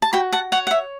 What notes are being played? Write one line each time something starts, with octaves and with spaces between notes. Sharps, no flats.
A5
F#4 G5 B5
F#5 A5
C#5 F#5
F#5
E5